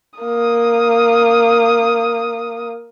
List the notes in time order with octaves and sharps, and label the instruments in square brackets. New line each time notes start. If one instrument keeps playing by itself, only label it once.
[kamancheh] A#3 D#6